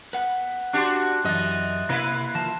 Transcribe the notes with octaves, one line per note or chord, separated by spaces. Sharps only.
B4 F#5
D4 F#4 G4 C6 F#6
F#2 E3 D#5 F#6 A6
C3 A#3 E4 B4 A#6
D#3 F3 F4 A5 A#6 E7